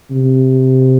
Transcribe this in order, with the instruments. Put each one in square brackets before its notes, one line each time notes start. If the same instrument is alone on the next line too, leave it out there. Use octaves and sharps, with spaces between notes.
[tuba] C3